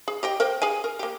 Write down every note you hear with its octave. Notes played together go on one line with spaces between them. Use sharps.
G#4
G4 D#5 G5
A#4 C5 G5
G#4 F5 G#5
A#4
A#3 G4